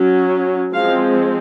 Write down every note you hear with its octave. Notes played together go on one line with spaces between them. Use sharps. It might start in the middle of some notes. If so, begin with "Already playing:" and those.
Already playing: F#3 C#4
F3 G#3 C4 F5